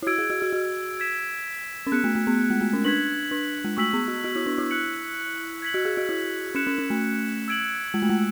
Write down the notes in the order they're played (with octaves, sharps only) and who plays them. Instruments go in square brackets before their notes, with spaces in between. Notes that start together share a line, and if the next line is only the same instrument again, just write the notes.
[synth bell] E4
[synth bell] F#4 [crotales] E6 G#6 D7
[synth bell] G#4
F#4
F#4
F#4
[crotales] G#6 B6 E7
[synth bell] C#4
[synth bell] B3 [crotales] F#6 C#7 E7
[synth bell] A3
A3
B3
G#3
A3
C#4
[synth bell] D4 [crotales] G#6 B6 F#7
[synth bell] D4
G#3
[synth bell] A3 [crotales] C#6 E6 B6 F#7
[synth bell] B3
F#4
F#4
E4
D4
E4
[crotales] F#6 C#7 F#7
G#6 B6 F#7
[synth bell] F#4
G#4
F#4
E4
[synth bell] C#4 [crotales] F#6 C#7 E7
[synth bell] C#4
C#4
A3
[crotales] E6 G#6 D7 F#7
[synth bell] G#3
A3
G#3